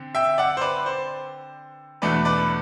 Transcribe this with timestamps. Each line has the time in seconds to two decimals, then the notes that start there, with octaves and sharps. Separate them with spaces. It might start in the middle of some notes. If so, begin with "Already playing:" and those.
Already playing: D3 C4
0.15 E5 G5
0.38 D5 F#5
0.57 C5
0.61 B4 D5
0.86 C5
2.02 E2 B2 A3 D4 B4 D5
2.25 B4 D5